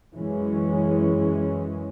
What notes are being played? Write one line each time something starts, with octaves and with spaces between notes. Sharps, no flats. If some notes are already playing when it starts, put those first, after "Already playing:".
F#2 E3 G#3 C#4